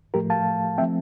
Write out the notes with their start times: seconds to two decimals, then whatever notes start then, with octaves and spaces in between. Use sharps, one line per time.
0.14 A2 F3 A3 G4 A#4
0.30 F5 A5
0.78 F3 A3 C4 E5 G5